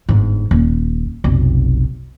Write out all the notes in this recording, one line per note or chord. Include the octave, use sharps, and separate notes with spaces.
G1 G#2
D#1
F1 B1